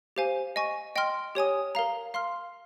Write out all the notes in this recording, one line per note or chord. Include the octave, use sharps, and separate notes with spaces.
G4 C5 F5 G#5
D#5 G#5 C#6
D#5 G5 C6 F6
G4 C#5 G#5 D#6
A#4 F5 A#5
F5 C6 F6